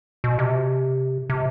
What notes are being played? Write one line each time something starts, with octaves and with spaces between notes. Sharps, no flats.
B2
C3
C3